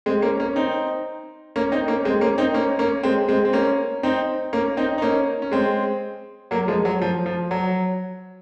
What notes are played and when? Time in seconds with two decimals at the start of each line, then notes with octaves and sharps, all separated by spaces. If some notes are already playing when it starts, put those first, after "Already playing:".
0.06 G#3 C4
0.22 A#3 C#4
0.40 A#3 C#4
0.56 C4 D#4
1.56 A#3 C#4
1.72 C4 D#4
1.88 A#3 C#4
2.05 G#3 C4
2.21 A#3 C#4
2.38 C4 D#4
2.54 A#3 C#4
2.79 A#3 C#4
3.03 G#3 C4
3.28 G#3 C4
3.45 C4
3.53 A#3 C#4
4.03 C4 D#4
4.53 A#3 C#4
4.77 C4 D#4
4.98 D#4
5.02 A#3 C#4
5.42 C#4
5.51 G#3 C4
6.51 F#3 A#3
6.68 F3 G#3
6.85 F#3
7.01 F3
7.26 F3
7.51 F#3